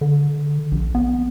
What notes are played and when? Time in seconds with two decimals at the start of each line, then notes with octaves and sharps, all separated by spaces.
0.01 D3
0.72 A#1
0.95 B3